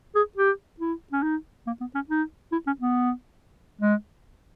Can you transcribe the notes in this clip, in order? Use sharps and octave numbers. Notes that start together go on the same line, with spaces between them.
G#4
G4
E4
C#4
D#4
A#3
B3
C#4
D#4
E4
C#4
B3
G#3